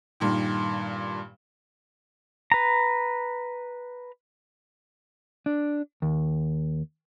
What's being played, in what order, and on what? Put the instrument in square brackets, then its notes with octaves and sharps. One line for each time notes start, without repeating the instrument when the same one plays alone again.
[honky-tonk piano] G2 A#2 D#3
[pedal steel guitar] B4 A#5
[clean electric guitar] D4
D#2